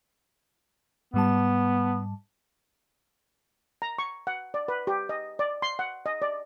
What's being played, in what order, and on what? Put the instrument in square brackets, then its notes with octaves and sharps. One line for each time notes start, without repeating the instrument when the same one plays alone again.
[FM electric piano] G#2 G3 A5 [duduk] B3
[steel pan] A#5
C#6
F#5
D5
B4
G4
D#5
D5
C6
F#5
D#5
D5